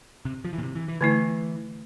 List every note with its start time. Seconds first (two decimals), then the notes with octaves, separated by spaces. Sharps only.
0.25 C3
0.45 F3
0.53 E3
0.58 A#2
0.63 C3
0.75 E3
0.88 E3
1.01 D3 E3 A3 E4